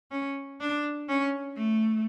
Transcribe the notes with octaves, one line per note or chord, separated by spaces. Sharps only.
C#4
D4
C#4
A3